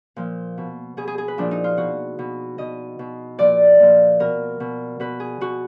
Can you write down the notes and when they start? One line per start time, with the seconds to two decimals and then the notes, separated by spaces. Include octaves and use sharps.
0.16 A#2 F3
0.58 B2
0.97 B2 G#4
1.07 G#4
1.18 G#4
1.28 B4
1.38 A#2 F3 D4
1.51 D#4
1.64 F4
1.77 B2 F#4
2.19 B2
2.58 B2 D#5
2.99 B2
3.39 A#2 F3 D5
3.80 A#2 F3
4.20 B2 A#4
4.60 B2
5.00 B2 B4
5.20 G#4
5.41 B2 F#4